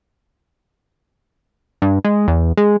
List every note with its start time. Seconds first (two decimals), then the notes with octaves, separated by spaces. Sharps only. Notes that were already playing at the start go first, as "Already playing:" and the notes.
1.82 G2
2.05 G#3
2.28 E2
2.57 G#3